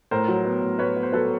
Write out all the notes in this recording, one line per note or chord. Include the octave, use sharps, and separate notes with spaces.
A2 A#4 C5
F#3
B3
A2
A2 B4 C#5
B3
C5
F#3 A4 B4